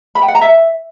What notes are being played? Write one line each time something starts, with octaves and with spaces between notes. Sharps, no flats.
B5
G5
F#5
A#5
E5